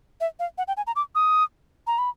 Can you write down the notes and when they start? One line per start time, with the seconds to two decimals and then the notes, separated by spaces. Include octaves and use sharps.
0.20 E5
0.39 F5
0.58 F#5
0.68 G5
0.77 G#5
0.87 A#5
0.96 D6
1.15 D#6
1.87 A#5
1.98 B5